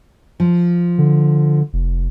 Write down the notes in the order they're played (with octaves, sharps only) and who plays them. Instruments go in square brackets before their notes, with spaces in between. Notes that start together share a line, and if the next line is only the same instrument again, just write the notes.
[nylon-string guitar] F3
[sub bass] D3
F1